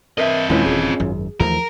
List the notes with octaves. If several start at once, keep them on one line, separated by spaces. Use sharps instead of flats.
C4 A#4 B4 D#5 E5
D#2 A#2 D#3 G#3 C#4 E4 F4 B4
D#1 E3 G#4
G#1 F#2
D#2 E3 F3 A3 A#4